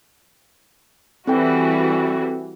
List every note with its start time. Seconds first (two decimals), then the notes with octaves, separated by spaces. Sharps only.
1.27 E3 G3 C4 F#4 A4 G5